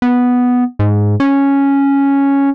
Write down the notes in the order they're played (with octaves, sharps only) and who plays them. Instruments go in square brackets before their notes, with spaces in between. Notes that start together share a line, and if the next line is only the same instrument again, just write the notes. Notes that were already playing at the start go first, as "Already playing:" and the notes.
[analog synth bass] B3
G#2
C#4